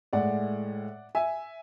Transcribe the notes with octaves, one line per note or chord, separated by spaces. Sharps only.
A2 G#3 D5 F#5
E5 G#5